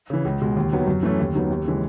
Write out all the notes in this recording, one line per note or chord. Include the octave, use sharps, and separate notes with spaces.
C#3 E3
C#2
B2 G#3
D#2
D#3 F#3 B3
F#2
E3 A3 C#4
D#2
D#3 F#3 B3
D#2
C#3 E3 G#3